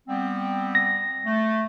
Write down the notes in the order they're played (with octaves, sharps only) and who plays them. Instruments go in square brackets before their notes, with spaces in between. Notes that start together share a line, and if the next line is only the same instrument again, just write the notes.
[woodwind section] G3 B3 C4
[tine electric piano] A#6
[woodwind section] A3